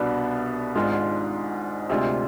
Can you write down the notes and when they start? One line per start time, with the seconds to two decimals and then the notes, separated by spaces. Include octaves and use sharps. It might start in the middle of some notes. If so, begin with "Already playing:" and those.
Already playing: C2 B2 B3 D4
0.75 G#1 G#2 G#3 D4 F4
1.90 D2 C3 G#3 D4 F4